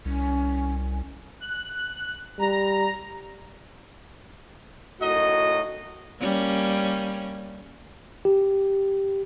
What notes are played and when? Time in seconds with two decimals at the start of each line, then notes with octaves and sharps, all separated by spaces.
0.05 C2 C#4
1.40 F#6
2.39 G3 A#5
5.01 F#2 A2 D#4 F#4 D#5
6.21 G3 A#3 C#4
8.25 G4